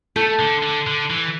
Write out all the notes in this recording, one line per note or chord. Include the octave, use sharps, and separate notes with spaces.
A3 A4
D3
D3
D3
E3